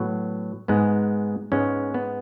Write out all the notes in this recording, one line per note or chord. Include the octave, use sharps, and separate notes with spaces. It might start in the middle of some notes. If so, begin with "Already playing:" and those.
Already playing: A2 F#3 B3
G#2 G#3 B3
G#2 G#3 B3 C#4
B3